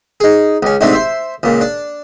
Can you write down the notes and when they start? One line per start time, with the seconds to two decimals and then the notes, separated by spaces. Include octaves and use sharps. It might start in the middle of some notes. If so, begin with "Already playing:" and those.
0.20 D#4 G#4
0.62 C#2 C#4
0.81 G#2 C3 A3 C4 D4
0.92 C5 E5
1.43 C#2 A#2
1.61 D4